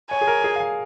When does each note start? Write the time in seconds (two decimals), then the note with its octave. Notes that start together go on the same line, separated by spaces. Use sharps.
0.11 C#5 G#5
0.21 G#4
0.27 A#4
0.44 G#4
0.56 F5
0.60 G#5